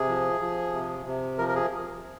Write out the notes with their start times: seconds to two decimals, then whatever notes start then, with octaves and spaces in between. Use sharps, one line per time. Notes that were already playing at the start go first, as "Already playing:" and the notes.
Already playing: C3 G#4
0.08 F3
0.41 F3
0.73 C3
1.06 C3
1.38 F3 A#4
1.48 A#4
1.55 G#4